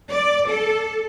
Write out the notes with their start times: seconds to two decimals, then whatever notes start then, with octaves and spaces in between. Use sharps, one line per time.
0.11 D5
0.47 A4